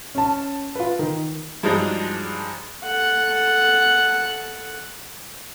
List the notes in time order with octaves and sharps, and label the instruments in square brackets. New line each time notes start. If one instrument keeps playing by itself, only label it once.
[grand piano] C#4 A5
F4 B4
D#3
G2 F3 F#3 G#3 D4 D#4
[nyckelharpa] A4 F#5